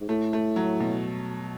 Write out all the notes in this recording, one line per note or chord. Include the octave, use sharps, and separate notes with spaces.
G#2
A2 A3
A3
F#3
B2